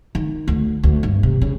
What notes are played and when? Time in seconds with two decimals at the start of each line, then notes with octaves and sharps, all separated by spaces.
0.15 D#3
0.48 D2
0.83 D2
1.03 G2
1.23 C3
1.42 C#3